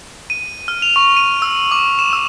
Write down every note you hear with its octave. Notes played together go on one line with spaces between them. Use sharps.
D#7
F6
F7
C#6
D#7
E6
D6
E7
E6